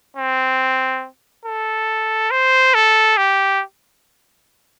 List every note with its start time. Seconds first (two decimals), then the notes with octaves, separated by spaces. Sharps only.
0.17 C4
1.46 A4
2.31 C5
2.74 A4
3.17 G4